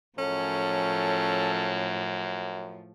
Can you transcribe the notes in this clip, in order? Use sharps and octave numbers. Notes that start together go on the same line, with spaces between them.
F#2 A2 F3 C#4 A4